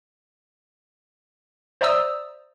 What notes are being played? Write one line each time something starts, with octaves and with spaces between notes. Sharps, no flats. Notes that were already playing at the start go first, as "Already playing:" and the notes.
C5 D5 E5 A#5 D#6 E6